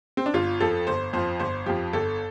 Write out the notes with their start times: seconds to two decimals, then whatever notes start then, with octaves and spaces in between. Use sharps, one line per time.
0.17 C4
0.26 D4
0.33 G1 F4
0.60 F2 F3 A4
0.87 G1 C5
1.13 F2 F3 C5
1.39 G1 C5
1.66 F2 F3 G4
1.93 G1 A4